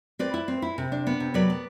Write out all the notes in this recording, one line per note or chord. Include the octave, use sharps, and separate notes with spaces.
C4 B4 D5
E4
C4
E4
C3
D4
B3
C3
F#3 B4 D5
B3